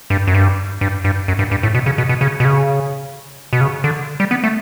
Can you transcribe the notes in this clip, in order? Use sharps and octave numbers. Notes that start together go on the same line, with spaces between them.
G2
F#2
G2
G2
G2
F#2
G2
G2
A2
B2
C#3
B2
B2
C#3
B2
C#3
B2
C#3
D3
G3
B3
A3